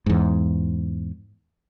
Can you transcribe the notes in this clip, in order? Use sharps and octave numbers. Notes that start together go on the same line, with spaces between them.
E2 G#2